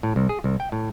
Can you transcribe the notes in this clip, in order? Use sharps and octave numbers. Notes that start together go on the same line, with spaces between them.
A2
C2
G#4
C2
G5
A2